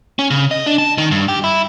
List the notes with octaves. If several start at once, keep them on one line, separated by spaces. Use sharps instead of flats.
C#4
C#3
D#5
D4
A5
D#3
G2
G4
E4